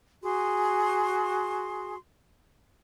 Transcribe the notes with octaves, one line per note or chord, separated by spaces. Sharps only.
F#4 G#4 C6